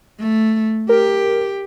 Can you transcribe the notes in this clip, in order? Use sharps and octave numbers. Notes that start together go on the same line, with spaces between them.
A3
G4 A#4